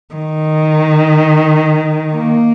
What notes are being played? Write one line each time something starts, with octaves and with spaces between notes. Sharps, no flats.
D#3
A#3